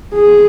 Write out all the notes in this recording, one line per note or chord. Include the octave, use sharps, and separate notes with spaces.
G#4